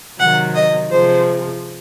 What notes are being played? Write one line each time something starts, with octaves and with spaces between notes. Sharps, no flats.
C3 D#3 F#3 F#5
D#5
C3 F3 G#3 C5